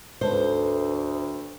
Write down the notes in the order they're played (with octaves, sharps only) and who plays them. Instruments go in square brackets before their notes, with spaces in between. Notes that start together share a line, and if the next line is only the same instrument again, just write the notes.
[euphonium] D2 [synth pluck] G#2 A4 B4 [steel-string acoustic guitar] C5